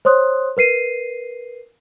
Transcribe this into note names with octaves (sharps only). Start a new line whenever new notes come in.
C5 C#5 C6 D#6 F#6
A#4 B4 C7 D#7